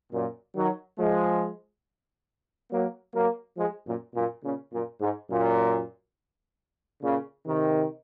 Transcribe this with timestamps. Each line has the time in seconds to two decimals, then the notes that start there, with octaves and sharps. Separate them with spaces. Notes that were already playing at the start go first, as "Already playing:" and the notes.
0.13 F#2 A#2
0.56 D#3 F#3
0.99 F3 G#3
2.71 F#3 A#3
3.15 F#3 A#3
3.58 F3 G#3
3.86 F#2 A#2
4.15 F#2 A#2
4.44 A#2 C#3
4.72 F#2 A#2
5.01 G#2
5.30 F#2 A#2
7.02 A#2 C#3
7.46 C3 D#3